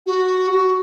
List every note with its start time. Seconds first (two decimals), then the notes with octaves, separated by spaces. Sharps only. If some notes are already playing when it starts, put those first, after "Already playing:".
0.07 F#4
0.52 F#4